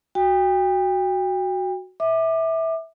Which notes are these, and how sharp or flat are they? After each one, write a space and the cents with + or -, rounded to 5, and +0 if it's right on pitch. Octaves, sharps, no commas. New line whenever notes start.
F#4 +0 G5 +35
E5 -20 D6 +25